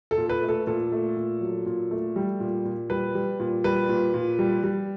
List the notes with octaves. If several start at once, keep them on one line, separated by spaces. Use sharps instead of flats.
A4
A#2
B4
A3
A4
A#2 A4
A3
A#2
F#3
A#2
A3
G3
A#2
A#2
G3 B4
G3
A#2
G3 B4
A#2
A#2
G3
G3